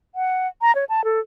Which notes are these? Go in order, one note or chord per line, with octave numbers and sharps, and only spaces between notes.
F#5
A#5
C#5
A5
A4